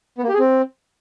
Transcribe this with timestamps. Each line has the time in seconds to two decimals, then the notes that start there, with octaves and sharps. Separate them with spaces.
0.18 B3
0.23 A#3
0.29 G4
0.34 G#4
0.39 C4